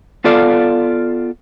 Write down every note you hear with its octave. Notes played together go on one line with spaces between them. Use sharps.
B3 F4 A4 D5 F5